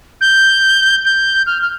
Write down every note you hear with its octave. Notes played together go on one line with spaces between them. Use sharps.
G6
G6
F6
F6